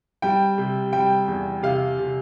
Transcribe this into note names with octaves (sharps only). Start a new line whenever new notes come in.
G3 G5
C3
G3 G5
E2
C3 F5
C3